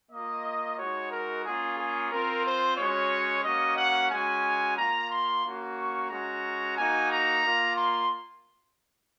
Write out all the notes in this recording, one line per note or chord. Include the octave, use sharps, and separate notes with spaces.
A#3 F4 D#5
G#3 D#4 F#4 C#5
A#4
A#3 C#4 F4 G#4
G#4
C4 F4 A#4
C5
G#3 C#4 F#4 C#5
A#3 C#4 F#4 D#5
F#5
G#3 C#4 F#4 G#5
A#3 F4 A#5
C6
A#3 C#4 F#4
C#6
G#3 C#4 F#4 A#5
A#3 D#4 F#4 G#5
A#5
A#3 F4
C6